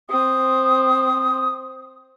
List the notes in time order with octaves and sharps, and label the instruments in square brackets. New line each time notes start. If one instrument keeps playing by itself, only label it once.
[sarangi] C4 [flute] D#6